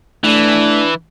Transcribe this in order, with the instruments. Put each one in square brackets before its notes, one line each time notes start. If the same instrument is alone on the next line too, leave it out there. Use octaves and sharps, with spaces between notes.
[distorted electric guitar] E3 [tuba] A3 [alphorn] D4